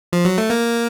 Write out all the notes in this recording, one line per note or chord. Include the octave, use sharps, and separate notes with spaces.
F3
F#3
A3
A#3